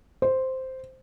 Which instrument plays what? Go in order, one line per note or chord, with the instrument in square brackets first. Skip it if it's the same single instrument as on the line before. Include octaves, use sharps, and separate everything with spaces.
[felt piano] C5